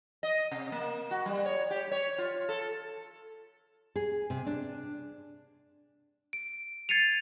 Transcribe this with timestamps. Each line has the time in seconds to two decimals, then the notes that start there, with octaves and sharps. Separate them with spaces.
0.23 D#5
0.51 C3
0.72 A#3
1.11 F#4
1.26 G3
1.46 C#5
1.70 G4
1.91 C#5
2.18 F4
2.49 A4
3.96 G#4
4.30 C3
4.46 D4
6.33 D7
6.89 G#6 A6 C7 C#7 D#7 F7